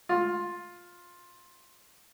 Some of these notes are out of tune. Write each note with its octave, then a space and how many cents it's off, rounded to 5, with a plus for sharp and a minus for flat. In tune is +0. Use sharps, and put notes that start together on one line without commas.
F4 +10